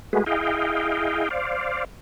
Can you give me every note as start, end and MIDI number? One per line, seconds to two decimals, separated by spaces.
0.13 0.24 56
0.13 0.24 57
0.13 0.24 66
0.13 0.24 68
0.13 0.24 71
0.26 1.29 64
0.26 1.29 68
0.26 1.29 75
0.26 1.29 77
0.26 1.29 79
1.30 1.85 72
1.30 1.85 74
1.30 1.85 77